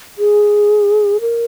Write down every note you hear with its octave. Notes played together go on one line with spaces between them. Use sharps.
G#4
A#4